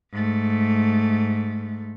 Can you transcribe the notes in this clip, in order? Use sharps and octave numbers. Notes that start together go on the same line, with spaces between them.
G#2 A3